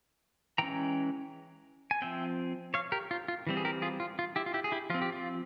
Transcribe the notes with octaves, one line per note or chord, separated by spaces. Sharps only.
E3 G#3 C#4 G5 A#5
G#5
F3 C4 E5 G5
C#5 F5
G4 A#4
F4
F4
E3 G3 C4
G#4
G4 A#4
F4 G#4
F4
F4
E4 G4
F4
E4 G4
G#4
E4 G4
F3 C4 F4
G4
F4